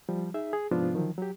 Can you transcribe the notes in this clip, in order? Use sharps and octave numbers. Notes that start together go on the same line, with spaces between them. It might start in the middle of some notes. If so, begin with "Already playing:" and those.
F3 G3
D#4 G#4 E5
G#4
G#2 C3 F3 B3 D4 F4
D3 D#3 F3 F#3
F#3 G4